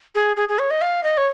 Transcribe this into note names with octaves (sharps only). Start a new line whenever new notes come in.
G#4
G#4
G#4
C#5
D#5
F5
D#5
C#5